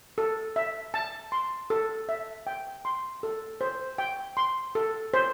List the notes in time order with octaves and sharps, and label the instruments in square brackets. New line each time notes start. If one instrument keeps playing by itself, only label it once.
[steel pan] A4
E5
A5
C6
A4
E5
G5
C6
A4
C5
G5
C6
A4
C5